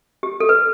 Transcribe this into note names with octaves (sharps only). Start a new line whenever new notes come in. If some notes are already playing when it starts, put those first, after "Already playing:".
G4
A4
B4